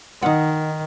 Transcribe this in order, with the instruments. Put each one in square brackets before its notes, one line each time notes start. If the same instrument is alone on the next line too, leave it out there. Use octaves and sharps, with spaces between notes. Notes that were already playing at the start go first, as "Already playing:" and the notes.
[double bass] D#3 [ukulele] D#4 F#5